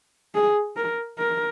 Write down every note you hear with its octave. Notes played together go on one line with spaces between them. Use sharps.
G#4
A#4
A#4